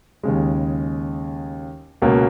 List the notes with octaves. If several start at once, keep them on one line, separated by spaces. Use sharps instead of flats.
D#2 C#3 G#3
C#2 B2 A#3 C#4